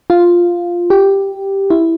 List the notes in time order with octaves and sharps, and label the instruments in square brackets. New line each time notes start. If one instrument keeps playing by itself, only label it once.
[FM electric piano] F4
G4
E4